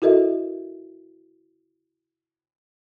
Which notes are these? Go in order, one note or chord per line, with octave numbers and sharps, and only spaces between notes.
E4 F#4 A4 A#4 D#5 E5